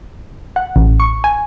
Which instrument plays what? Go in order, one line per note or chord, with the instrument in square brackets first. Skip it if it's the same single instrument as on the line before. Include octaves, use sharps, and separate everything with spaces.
[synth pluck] F#5
A1
C#6
G#5